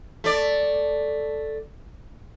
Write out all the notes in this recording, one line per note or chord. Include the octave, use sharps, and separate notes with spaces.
A3 D5